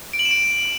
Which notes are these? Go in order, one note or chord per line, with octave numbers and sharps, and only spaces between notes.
D7
F#7
E7
D7